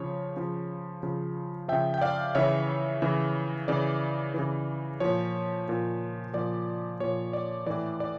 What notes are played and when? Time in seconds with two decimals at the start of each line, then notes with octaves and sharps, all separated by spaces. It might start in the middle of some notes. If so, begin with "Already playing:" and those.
Already playing: C#3 F3 C#5
0.36 C#3 F3
1.03 C#3 F3
1.68 C#3 F3 E5 G5
1.94 G5
2.01 D5 F5
2.35 C#3 E3 C#5 E5
3.02 C#3 E3
3.68 C#3 E3 D5
4.34 C#3 E3
5.00 A#2 F3 C#5
5.68 A#2 F3
6.33 A#2 F3 D5
7.00 A#2 F3 C#5
7.33 D5
7.66 A2 E3 D5
8.00 D5